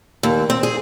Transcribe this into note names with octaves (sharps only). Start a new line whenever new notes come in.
D#2
C4
G#4